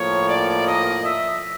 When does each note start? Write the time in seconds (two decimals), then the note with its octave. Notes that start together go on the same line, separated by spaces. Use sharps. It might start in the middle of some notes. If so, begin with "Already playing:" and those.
Already playing: A2 F3 A#3 C#5
0.29 D5
0.67 D#5
1.05 E5